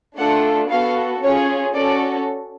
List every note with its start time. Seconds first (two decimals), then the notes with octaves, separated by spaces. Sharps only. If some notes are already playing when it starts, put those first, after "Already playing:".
0.17 A3 D4 F4 A4 F#5
0.70 B3 F#4 A4 F5
1.22 C#4 F4 G#4 C#5
1.75 C#4 F#4 A4 D5